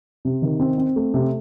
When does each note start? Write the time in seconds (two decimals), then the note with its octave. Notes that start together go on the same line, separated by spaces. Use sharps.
0.25 C3
0.42 D#3
0.60 C4
0.78 C4
0.96 A3
1.14 C3